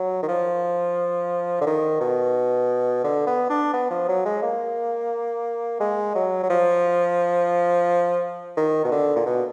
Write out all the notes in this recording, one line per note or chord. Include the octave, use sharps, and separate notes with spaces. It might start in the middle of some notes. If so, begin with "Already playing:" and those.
Already playing: F#3
D#3
F3
D3
D#3
B2
D3
B3
D4
B3
F3
F#3
G#3
A#3
G#3
F#3
F#3
F3
D#3
B2
D3
A#2
B2